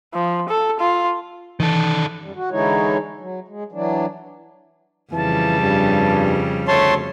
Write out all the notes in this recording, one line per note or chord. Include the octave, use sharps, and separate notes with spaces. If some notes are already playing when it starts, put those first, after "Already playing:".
F3
A4
F4
D#3 E3 A4
F#2 G3
F#4
D3 E3 G#3 D#4 E4 C#5
F#3
G#3
E3 F#3 D4
F2 C#3 E3 G3 A5
G2
D2 A3 C#5 A5 C6